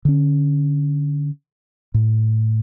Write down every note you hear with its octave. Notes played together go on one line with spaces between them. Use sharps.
D3 C#4
A2